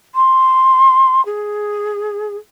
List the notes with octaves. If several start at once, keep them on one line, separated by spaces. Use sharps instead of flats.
C6
G#4